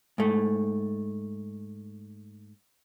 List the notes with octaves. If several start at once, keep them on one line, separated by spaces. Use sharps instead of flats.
G#2 A3